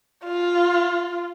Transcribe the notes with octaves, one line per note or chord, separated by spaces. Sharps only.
F4